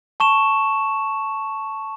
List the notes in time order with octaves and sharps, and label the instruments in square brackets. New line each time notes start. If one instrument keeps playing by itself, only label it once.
[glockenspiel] A5 C#6 E7